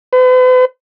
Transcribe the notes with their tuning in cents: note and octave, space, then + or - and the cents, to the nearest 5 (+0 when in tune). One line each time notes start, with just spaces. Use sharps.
B4 +45